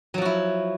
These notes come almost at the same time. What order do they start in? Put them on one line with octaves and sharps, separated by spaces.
F#3 F3 F#4 E4